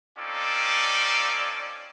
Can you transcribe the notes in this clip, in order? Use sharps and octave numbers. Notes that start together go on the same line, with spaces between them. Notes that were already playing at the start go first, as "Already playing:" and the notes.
C4 C#4 D#4 F4 A4 D5